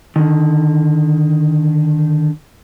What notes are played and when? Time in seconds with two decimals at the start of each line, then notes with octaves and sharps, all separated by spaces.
0.16 D3 D#3